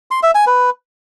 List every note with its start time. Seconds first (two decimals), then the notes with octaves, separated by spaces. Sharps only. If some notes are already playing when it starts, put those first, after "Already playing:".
0.11 C6
0.23 E5
0.35 G#5
0.47 B4